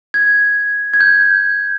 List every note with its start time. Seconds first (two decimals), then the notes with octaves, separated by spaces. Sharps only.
0.14 G#6
0.94 G#6
1.00 G6